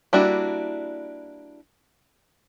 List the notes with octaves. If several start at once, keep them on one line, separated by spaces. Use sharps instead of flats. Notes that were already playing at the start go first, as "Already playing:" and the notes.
G3 A#3 D4 E4 F#4